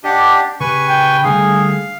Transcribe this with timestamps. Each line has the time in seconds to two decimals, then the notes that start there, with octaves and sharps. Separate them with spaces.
0.04 D4 G4 D#5 F#5
0.60 C#3 G4 B4 G#5 C#6
0.89 G5
1.24 D3 G3 A3 G#4 F5